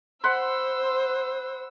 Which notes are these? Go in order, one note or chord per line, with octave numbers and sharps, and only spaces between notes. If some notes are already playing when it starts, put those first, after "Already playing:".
C5 F#5 B5 C6 E6